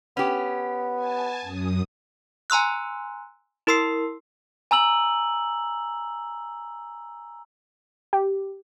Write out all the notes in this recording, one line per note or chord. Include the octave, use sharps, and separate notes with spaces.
B3 C#4 G4
G#5 A5
F#2 D#6
G#5 A#5 C6 E6 F#6
E4 A#4 C6 E6 C7
G#5 A#5 E6 F#7
G4